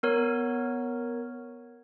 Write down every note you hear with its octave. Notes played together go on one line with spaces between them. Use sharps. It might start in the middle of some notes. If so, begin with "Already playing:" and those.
B3 A#4 C#5